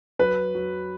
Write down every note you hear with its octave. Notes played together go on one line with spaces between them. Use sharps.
F#3 B4
F#3